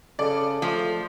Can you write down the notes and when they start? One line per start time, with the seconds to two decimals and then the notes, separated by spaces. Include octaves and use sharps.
0.19 C#3 A4 D5
0.62 F3 A3